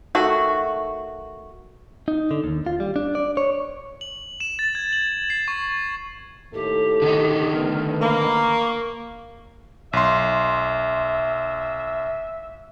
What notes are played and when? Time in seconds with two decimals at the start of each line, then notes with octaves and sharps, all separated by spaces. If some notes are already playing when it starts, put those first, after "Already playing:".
0.15 D#3 A3 F#4
2.08 D#4
2.31 D3
2.44 D#2
2.66 F4
2.80 G3
2.96 D4
3.15 D5
3.37 C#5
4.01 F#7
4.40 E7
4.59 A6
4.75 G#6
4.93 F#7
5.30 C7
5.48 C#6
6.53 D#2 A2 G4 A4
7.02 D3 D#3 D#4
7.52 A3 B3 A#4
8.02 A#3 B5
8.41 C#6
9.93 B1 E5 C6